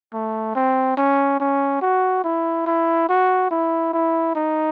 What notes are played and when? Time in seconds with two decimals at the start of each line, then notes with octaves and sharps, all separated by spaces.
0.13 A3
0.55 C4
0.97 C#4
1.40 C#4
1.82 F#4
2.24 E4
2.67 E4
3.09 F#4
3.51 E4
3.93 E4
4.35 D#4